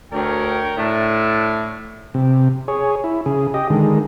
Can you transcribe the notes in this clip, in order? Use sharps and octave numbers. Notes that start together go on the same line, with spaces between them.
D2 A#4 C#5 G5
A2 D4 E5
C3
G#4 C#5
E4
C#3 G#4
G4 D#5
D3 D#3 G#3